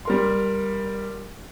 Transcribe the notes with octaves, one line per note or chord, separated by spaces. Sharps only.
G3 A#4 C6